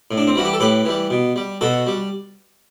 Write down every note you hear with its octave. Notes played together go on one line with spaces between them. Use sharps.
A2
D4
C4
E3 G3 F#4
G4
A4
A2 G4 B4
E3 G3
B2
G3
B2 F#4 A4
G3